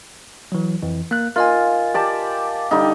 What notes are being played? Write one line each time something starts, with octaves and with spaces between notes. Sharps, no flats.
E3 F#3
F2 E3
A#3 F#6
F4 A#4 D#5 G#5
G4 D5 A5
D3 G3 D#4